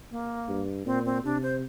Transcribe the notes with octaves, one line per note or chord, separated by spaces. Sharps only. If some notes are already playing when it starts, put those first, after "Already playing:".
A#3
G2
A#2 C4
C4
C3 D4
C5